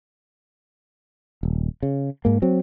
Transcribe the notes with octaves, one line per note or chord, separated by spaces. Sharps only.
D#1
C#3
G#2 A#3
F#3 C4